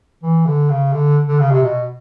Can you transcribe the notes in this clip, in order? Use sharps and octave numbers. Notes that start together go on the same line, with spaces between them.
E3
D3
C#3
D3
D3
C#3
C3
B2